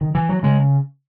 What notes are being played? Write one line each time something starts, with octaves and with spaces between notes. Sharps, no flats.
D#3
E3
F#3
C#3 G#3